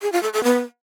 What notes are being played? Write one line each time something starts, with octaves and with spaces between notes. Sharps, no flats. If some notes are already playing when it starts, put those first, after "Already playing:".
G#4
F4
A4
A4
B3